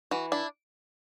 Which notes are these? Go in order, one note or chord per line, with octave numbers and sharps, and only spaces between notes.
E3 F#4
D4 E4